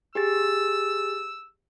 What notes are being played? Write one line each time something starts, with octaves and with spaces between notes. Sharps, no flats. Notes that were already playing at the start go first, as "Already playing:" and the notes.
G4 G#4 E6 A6